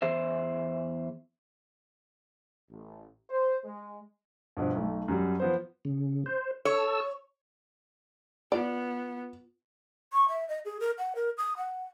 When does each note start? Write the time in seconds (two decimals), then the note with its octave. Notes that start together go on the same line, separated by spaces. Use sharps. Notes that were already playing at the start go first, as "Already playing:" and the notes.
0.02 E2 G#4 C5 E5
2.70 A1
3.30 C5
3.64 G#3
4.57 G2 B2 F3
4.75 B1 A3
5.08 F#2 F#3 G3
5.40 F3 B3 C5
5.85 C#3
6.26 C5
6.65 A4 C#5 E6
8.52 B3 F4 D5
10.13 C#6
10.29 E5
10.49 D#5
10.65 G#4
10.80 A#4
10.98 F#5
11.15 A#4
11.38 D#6
11.57 F#5